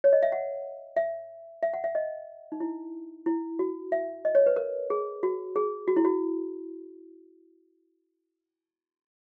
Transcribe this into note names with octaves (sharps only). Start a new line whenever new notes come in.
C#5
D#5
E5
F#5
E5
E5
F#5
E5
D#5
D#4
E4
E4
F#4
E5
D#5
C#5
B4
A#4
G#4
F#4
G#4
F#4
E4
F#4